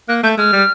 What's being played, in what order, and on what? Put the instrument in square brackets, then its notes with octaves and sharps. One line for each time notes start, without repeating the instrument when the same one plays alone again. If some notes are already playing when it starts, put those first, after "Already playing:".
[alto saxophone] A#3 [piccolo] F#6
[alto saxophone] A3 [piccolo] G6
[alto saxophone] G#3 [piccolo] F6
[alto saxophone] G3